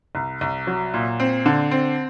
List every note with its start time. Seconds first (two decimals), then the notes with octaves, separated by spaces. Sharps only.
0.15 C2
0.41 C2
0.67 F#3
0.94 A#2
1.20 C4
1.46 D3
1.71 C4